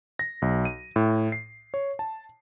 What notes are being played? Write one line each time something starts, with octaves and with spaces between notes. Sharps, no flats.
A#6
B1
D#7
A2
C7
C#5
A5